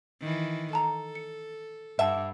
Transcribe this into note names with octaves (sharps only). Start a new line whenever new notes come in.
D#3 E3
A4 A5 A#5
C#7
G2 E5 F#5 A5